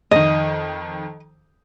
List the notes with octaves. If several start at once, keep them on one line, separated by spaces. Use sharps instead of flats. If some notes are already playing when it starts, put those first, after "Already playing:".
F2 D#3 D#5